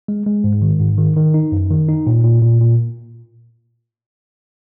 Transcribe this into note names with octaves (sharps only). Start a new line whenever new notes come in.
G#3
G#3
G#2
D#3
G#2
D#3
D#3
D#4
F#2
D#3
D#4
A#2
A#2
A#2
A#2